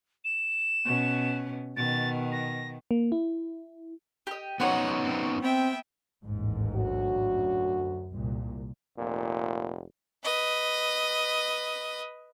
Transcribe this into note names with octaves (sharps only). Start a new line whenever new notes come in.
E7
B2 C#4
B2 D#3 A6
A#6
A#3
E4
G4 D#5
B3 C#4 D#4 F#4 C5 C#5 F#5 D#6
C4
B3 C4 E5 G5
A1 D#2 G#2
D2 F#3 F#4
F#2
C2 A#2
F1 A#2
B4 D#5